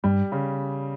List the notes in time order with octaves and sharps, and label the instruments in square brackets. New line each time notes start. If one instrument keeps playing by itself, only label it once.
[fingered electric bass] G2 [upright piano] G3
[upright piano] C#3